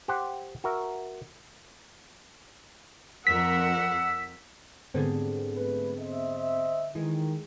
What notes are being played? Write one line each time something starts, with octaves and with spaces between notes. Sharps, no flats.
G4 C5 F#5
F#4 A#4 E5
F2 A#4 F#5 E6 B6
G#2 D3 G3 B3 C4 G#4
A3 B4
C5 D#5 E5
D#3 E3 G#3